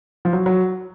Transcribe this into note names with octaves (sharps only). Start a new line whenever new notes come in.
F3
F#3
F#3